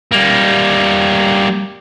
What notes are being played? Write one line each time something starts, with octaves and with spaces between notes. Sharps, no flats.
G3 A#3